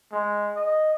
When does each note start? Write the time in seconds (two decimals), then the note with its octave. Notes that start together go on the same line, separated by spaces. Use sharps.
0.12 G#3
0.56 D#5